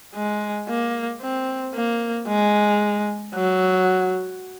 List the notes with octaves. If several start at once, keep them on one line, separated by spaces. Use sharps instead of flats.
G#3
A#3
C4
A#3
G#3
F#3